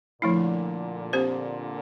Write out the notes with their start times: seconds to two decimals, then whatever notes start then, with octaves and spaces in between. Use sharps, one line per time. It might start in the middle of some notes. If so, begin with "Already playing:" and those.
0.22 A#2 D3 F3 A3 E4
1.13 C4 G4 C5